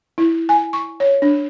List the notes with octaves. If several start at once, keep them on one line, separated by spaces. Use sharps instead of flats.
E4
G#5
C#6
C#5
D4